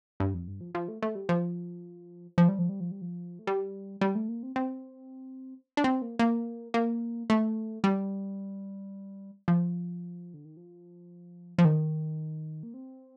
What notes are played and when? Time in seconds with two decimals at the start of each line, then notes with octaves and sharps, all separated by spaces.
0.20 G2
0.34 F2
0.48 G2
0.61 F3
0.75 F3
0.88 A3
1.02 A3
1.15 G3
1.29 F3
2.38 F3
2.49 G3
2.59 F3
2.69 G3
2.80 F3
2.91 G3
3.01 F3
3.39 A3
3.47 G3
4.01 G3
4.15 A3
4.28 A#3
4.43 C4
4.56 C4
5.77 D4
5.84 C4
6.02 A#3
6.19 A#3
6.74 A#3
7.30 A3
7.84 G3
9.48 F3
10.34 D3
10.45 D#3
10.57 F3
11.58 F3
11.65 D#3
12.63 A#3
12.74 C4